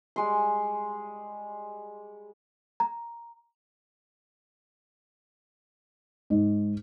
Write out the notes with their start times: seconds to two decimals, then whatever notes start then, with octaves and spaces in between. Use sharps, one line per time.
0.16 G3 G#3 C6
2.80 A#5
6.30 G#2